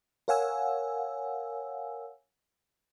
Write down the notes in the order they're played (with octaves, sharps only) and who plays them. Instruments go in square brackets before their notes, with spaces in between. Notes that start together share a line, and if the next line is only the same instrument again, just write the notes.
[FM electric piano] A#4 C#5 F5 F#5 G#5 E6